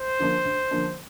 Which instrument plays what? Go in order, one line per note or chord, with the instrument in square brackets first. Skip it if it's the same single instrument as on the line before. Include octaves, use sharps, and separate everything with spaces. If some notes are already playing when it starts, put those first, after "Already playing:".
Already playing: [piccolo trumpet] C5
[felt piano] D3 F3 A#3 D4
D2
D3 F3 A#3 D4